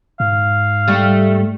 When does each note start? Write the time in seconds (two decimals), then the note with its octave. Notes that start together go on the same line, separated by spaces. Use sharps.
0.20 G#2 F5
0.88 G3 A3